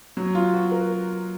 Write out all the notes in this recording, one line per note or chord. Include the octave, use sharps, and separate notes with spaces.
F#3
F4
F#4
A#4